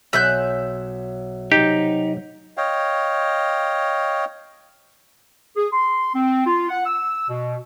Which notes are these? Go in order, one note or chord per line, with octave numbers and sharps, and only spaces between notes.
B1 C#5 E5 G#5 F#6 G6
C3 F#3 D#4 G4
C#5 D#5 F5 G5
G#4
C6
C4
F4
F#5
E6
B2